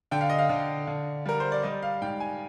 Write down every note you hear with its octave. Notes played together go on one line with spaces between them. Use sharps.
D3 G5
F5
D#5
F5
D3
D3
G3 A#4
C5
D5
G3 D#5
F5
G#2 G5
G#5